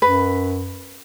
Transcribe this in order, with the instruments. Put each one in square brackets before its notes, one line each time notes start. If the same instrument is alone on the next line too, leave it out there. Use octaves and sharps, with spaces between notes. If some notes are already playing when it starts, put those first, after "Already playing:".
[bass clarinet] F#2 [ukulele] B4